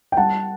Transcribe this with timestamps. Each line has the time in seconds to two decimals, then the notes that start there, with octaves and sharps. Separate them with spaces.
0.12 G5
0.17 G3 F#5 A5